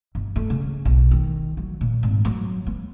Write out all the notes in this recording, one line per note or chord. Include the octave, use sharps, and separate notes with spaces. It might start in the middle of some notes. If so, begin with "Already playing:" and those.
G1
A3
C#3
B1
D#3
F#3
A#2
G#1
F#3
B3